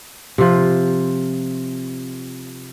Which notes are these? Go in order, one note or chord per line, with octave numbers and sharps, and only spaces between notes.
C3 F3